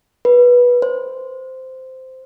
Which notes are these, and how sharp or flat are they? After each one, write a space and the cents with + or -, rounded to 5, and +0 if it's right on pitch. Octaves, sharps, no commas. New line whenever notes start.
B4 -15
C5 -10